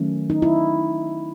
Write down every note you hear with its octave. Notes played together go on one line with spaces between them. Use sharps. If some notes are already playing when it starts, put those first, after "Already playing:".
Already playing: D#3 F#3 A3 C#4
D#4
E4